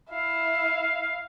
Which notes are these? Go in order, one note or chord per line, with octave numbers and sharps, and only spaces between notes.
E4 F5